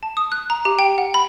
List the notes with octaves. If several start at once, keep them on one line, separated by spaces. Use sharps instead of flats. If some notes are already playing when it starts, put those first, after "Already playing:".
A5
D#6
F#6
A#5
G4
G5
F#5
B5